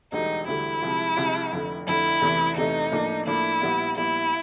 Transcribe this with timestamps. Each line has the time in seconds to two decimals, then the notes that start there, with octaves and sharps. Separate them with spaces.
0.12 E1 D2 D3 G3 D#4
0.47 E1 D2 D3 G3 E4
0.83 C2 C3 F3 G#3
1.17 C2 C3 F3 G#3
1.52 F1 F2 D3
1.87 F1 F2 D3 E4
2.22 E2 C3 E3 A3
2.57 E2 C3 E3 A3 D#4
2.91 A2 F3 A#3 D4
3.26 A2 F3 A#3 D4 E4
3.61 A#1 A#2 G3 B3
3.97 A#1 A#2 G3 B3 E4